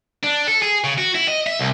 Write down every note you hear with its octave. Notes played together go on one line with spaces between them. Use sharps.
D4
A4
G#4
C#3
F#4
E4
D#5
E5
C2